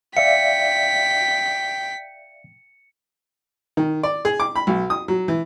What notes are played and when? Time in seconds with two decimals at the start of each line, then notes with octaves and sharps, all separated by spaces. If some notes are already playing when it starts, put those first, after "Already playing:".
0.17 D5 E5 F5 G5 B6 C#7
3.77 D#3
4.03 D5
4.25 G#4
4.40 D6
4.56 B5
4.67 B1
4.90 D#6
5.08 F#3
5.28 E3